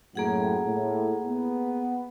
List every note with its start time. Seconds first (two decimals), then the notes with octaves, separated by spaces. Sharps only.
0.15 F#2 A2 A#3 G#4 F#5
0.66 A2
1.26 B3